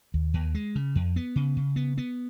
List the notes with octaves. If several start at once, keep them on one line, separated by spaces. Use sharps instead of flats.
D#2
D#2
G#3
C#3
F2
B3
C#3
C#3
B3
B3